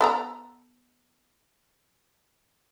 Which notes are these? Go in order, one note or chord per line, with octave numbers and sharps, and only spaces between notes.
B3 A4 A#5